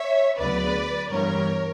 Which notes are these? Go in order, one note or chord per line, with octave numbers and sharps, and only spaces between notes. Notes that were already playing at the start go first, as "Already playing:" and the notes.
Already playing: C#5 E5
D2 C#3 F#3 B3 B4 D5
G2 E3 G3 B3 A#4 C#5